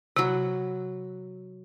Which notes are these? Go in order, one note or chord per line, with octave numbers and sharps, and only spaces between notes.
C3 F#3 F#5 B5